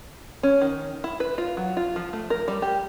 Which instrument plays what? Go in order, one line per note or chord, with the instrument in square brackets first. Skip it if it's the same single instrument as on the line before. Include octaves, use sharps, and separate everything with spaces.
[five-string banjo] C#4
D#3
E4
B4
F4
F#3
F4
F3
A3
A#4
G3
G4